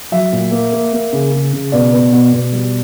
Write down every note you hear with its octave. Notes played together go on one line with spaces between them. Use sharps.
F#3 E5
A#2
A#3
A#3
A#3
C#3
C#3
C#3
B2 D5
B3
B2
B2
G3